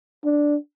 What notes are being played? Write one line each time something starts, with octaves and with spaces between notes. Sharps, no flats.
D4